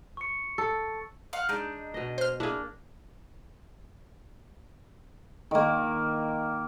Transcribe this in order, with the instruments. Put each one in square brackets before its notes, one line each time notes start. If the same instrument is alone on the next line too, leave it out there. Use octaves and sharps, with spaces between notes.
[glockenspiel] C#6 C#7
[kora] A4
[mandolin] F5 F#5
[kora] G#3 [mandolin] D4 D#4
[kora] B2 D#5
[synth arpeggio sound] C5 F6
[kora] A#3 D4 [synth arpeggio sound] E4 G#4
[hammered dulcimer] D#3 A#3